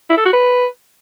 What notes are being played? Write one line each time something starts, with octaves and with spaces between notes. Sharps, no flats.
E4
A4
F#4
B4